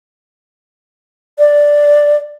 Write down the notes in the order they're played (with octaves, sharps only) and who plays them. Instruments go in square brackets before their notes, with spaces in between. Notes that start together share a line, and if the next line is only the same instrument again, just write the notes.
[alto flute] D5